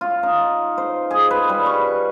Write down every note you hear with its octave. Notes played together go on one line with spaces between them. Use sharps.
F4
D#4
C5
G#4
B4
G3
C#6